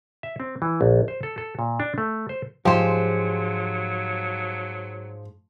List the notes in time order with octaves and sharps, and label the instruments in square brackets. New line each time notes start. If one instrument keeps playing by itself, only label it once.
[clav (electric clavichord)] E5
C4
E3
A#1
C5
A4
A4
A#2
D4
A3
C5
[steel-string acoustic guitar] G#2 G#3 [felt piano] F3 [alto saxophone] F#3 [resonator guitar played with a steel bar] G4 C5